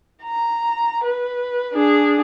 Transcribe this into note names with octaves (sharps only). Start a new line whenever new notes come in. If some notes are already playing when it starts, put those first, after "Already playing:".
A#5
B4
D4 G#4